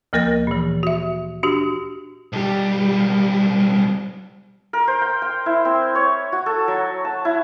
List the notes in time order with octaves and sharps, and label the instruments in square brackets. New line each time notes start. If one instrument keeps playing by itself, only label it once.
[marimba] D2 F3 A#3 A#4 A6 A#6
A#2 E3
F#4 E5
D4 F#4 G4
[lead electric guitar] B1 G3
[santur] A#4
C5
G5
G5
E4
C4
C#5
F#4
A4
F#3
A5
E4